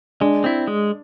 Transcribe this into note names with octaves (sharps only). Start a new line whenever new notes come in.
G#3 D4
C4 E4
G#3